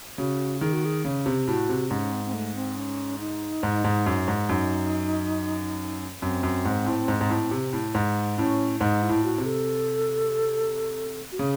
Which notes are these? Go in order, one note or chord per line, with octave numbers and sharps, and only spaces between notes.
C#3 F#4
D#3 G#4
F#4
G#4
C#3
C3
A2 F#4
C3
G#2 C#4
C4
C4
A3
C4
C#4
D#4
G#2
G#2
F#2
G#2
F#2 D#4
F#2 C4
F#2
G#2
A2
G#2
G#2
A2
C3
A2
G#2
A2 C#4
G#2 D#4
E4
A2
F#4
C3
A4
F#4
C#3 G#4